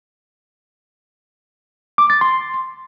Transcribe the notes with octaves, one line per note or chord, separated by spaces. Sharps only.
D6
A6
C6